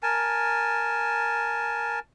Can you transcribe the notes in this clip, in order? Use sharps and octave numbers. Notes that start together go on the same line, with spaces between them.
A#4 G#5 A5